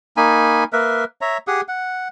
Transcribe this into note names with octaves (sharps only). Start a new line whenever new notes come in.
A#3 D#4 G#5 B5
A#3 A#4 B4 E5
C#5 E5 A#5
G4 G#4 F#5 D#6
F#5